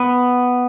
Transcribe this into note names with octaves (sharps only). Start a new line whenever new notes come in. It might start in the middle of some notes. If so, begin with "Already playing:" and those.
Already playing: B3